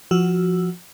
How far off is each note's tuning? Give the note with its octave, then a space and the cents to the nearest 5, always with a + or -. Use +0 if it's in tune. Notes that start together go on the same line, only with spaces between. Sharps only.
F3 +0 F#4 +0 E6 +0